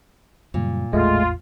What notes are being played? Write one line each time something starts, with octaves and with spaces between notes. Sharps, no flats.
F#2 A#2 C#3 G3
A1 E2 G#3 A3 F4